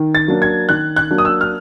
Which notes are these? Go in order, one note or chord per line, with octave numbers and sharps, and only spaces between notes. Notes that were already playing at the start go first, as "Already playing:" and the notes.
Already playing: D#3
A6
F#3 A#3 D4
G#6
D#3 F#6
F#6
F#3 A#3 D4
D#6
E6
F6